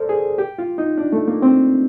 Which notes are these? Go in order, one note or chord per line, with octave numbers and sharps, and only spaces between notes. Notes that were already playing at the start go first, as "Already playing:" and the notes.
Already playing: A4 A#4 C5 D5
G#4
G4
F4
D#4
D4
A3
A#3
C4